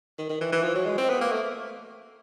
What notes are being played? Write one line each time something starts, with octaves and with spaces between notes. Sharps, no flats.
D#3
D#3
E3
E3
F3
F#3
G#3
C4
B3
A#3
A3